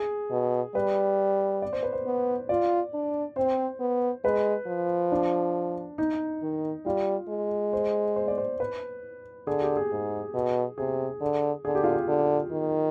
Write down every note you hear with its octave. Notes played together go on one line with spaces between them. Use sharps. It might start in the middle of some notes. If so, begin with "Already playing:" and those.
Already playing: G#4
B2
G3 B4
D5
C5
B4
C5
B3
F4 D5
D4
C4 C5
B3
G#3 B4
F3
D4
D#4
D#3
G3 F4
G#3
C5
C5
D5
C5
B4
D3 G#4
G4
G#4
G#2
B2
C3 G#4
D3
D3 G#4
G4
F4
G4
D3
D#3